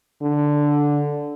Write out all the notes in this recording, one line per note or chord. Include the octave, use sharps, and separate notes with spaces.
D3